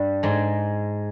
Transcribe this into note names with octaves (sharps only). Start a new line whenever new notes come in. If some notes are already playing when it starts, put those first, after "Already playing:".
Already playing: G2 G3
G#2 G#3